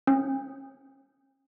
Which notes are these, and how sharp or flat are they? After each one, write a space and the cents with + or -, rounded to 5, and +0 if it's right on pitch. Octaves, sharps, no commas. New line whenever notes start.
C#4 -35